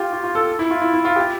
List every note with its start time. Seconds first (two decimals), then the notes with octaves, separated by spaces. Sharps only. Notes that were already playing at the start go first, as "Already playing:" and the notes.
Already playing: F4 G4
0.13 F4
0.24 F4
0.35 A4
0.59 E4
0.71 F4
0.82 E4
0.94 E4
1.05 F4
1.16 G4